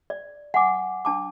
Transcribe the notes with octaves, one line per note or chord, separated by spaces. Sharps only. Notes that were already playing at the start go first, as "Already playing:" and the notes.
D5
F#5 G#5 D6
D4 A5 D6